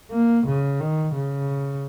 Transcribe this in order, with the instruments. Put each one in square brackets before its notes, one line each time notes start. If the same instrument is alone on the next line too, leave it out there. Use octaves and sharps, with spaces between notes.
[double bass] A#3
C#3
D#3
C#3